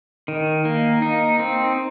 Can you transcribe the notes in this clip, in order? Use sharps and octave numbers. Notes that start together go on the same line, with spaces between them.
D#3
A#3
D#4
C4